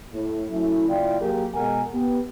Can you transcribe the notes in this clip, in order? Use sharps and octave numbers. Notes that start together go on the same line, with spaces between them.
A2
F#3 A3 C#4 E4
F#1 E4 F4 D5 G5
F#3 A#3 G4 G#4 A#4
B2 G#3 A#4 F#5 G#5
B3 G4